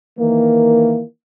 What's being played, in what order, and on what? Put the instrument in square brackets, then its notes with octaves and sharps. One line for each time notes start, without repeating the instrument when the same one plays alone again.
[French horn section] D#3 E3 A#3